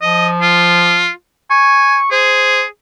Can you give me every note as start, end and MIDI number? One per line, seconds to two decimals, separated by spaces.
0.02 1.09 53
0.02 0.28 75
0.42 1.10 65
1.51 1.98 80
1.51 2.07 85
2.11 2.65 68
2.11 2.63 72